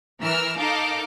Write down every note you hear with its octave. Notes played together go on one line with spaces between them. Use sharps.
E3 A#4 E6 F6
D#4 A4 A#4 F5 D6